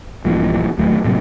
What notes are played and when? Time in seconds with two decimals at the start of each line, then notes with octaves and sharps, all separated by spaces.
0.25 A#1 G2 A#2 E3
0.78 D1 D#2 F#3 A3
1.04 A2 C3 F#3 A#3